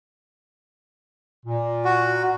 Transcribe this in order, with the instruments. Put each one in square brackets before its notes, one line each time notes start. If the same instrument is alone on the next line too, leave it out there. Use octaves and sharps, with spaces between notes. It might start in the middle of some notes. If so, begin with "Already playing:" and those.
[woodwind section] A#2
[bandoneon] F#4